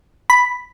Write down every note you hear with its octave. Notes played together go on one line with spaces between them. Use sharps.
B5